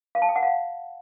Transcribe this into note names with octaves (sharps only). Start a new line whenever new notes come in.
F5
A5
G5
F#5
F5